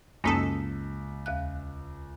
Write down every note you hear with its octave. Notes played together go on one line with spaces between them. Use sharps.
C#2 F#2 A#3 C#4 D#4 A4 B6
D#2 F5 F#6